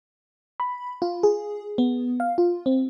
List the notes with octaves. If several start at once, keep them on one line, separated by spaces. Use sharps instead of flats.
B5
F4
G#4
B3
F5
F4
C4